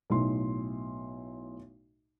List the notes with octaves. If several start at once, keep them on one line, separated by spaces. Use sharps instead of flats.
B1 A2 C6